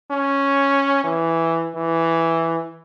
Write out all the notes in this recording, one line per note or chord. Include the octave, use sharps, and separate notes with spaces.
C#4
E3
E3